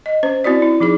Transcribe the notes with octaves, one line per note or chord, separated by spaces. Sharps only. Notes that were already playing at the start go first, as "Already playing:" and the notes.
D#5
C#4 C5
C4 E4 F#4 D5
E4
F3 D#4 G#4 D6